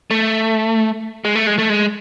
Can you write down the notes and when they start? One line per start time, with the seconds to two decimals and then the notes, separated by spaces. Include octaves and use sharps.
0.11 A3
1.25 G#3
1.35 A3
1.47 G#3
1.58 A3
1.70 G#3